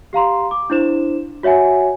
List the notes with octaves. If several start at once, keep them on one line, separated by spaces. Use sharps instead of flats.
G4 F5 A#5 C6
D6
D4 E4 C5 E7
F#4 C#5 E5 F#5 G#5